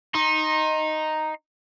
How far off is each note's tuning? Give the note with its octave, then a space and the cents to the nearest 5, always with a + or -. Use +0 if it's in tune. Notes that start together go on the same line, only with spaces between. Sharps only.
D#4 +0 C6 +30